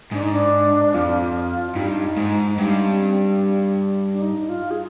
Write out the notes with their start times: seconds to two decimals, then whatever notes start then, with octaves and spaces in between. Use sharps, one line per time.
0.12 G#2 D4
0.22 D#4
0.33 D4
0.94 F2 F4
1.71 F4
1.76 G2 D#4
2.17 G#2
2.58 G2 D#4
2.85 C4
3.05 C4
3.13 D4
4.13 D4
4.21 D#4
4.49 F4
4.71 G#4